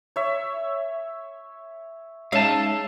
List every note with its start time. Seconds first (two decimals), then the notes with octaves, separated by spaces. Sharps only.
0.16 C#5 E5
2.32 G#3 C#4 D#4 E5 F5 A5